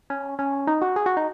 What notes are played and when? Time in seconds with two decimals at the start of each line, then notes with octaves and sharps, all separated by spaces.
0.10 C#4
0.39 C#4
0.67 D#4
0.82 F#4
0.96 G#4
1.06 F#4
1.17 D#4